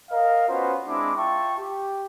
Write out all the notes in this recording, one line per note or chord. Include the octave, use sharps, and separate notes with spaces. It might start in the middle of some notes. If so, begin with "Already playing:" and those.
A#4 D#5 F5
B3 C#4 F4 F#4 C5
G#3 C4 D4 E4 D6
F4 E5 G5 A5 C#6
G4